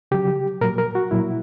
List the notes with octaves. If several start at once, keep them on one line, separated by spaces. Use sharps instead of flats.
C#3 F#3 G4
A#2 F#3 A#4
A#4
F#4
A#2 F#3 E4